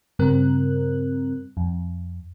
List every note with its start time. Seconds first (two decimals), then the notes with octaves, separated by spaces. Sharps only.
0.19 G2 C#3 G3 C4 A#4 F#6
1.57 F2